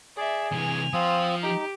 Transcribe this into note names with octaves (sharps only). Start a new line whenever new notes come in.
G#4 D5 E5
C3 E3 G#5 F7
F3 C4 F4 D#6
D#4 G4